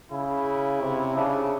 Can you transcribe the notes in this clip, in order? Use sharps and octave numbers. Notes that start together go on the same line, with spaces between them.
C#3 E4
C3
C#3 D4